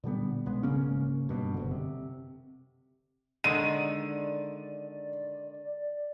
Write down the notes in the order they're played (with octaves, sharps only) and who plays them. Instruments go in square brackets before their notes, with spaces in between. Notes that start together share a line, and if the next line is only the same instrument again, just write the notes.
[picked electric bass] A#2 D3 G3 B3
B1 G#3 B3
G#1 C#3 A#3 C#4
G2 B2
F#1 D3
C3
[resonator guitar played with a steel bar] D3 D#3 G#3 [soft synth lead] D5 [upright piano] D#7